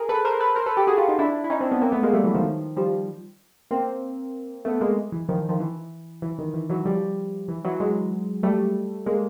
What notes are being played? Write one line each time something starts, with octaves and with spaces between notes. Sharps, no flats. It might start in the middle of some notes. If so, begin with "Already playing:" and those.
Already playing: G#4 A#4
A4 B4
A#4 C5
A4 B4
A#4 C5
A4 B4
G4 A4
F#4 G#4
F4 G4
D#4 F4
D4 E4
E4
C#4 D#4
C4 D4
B3 C#4
A#3 C4
A3 B3
G#3 A#3
G3 A3
E3 F#3
D#3 F3
F3 G3
A#3 C4
A3 B3
G#3 A#3
E3
D#3 F3
D#3 F3
E3
E3
D#3
E3
E3 F#3
F3 G3
E3
E3 F#3
F#3 G#3
G3 A3
G#3 A#3